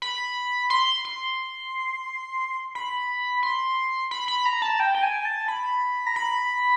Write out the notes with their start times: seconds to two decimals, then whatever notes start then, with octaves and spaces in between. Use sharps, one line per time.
0.02 B5
0.70 C6
1.05 C6
2.75 B5
3.43 C6
4.11 B5
4.28 B5
4.45 A#5
4.62 A5
4.80 G5
4.95 G5
5.03 G#5
5.25 A5
5.48 B5
6.07 A#5
6.16 B5